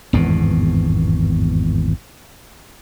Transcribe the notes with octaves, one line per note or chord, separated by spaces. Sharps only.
G#1 E2 G2 B2